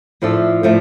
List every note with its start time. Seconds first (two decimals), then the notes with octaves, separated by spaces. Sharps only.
0.22 A2 F3 A3 D4 A4
0.63 A2 F3 A3 D4